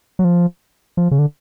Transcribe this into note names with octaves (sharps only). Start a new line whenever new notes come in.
F#3
F3
F3
C#3
D3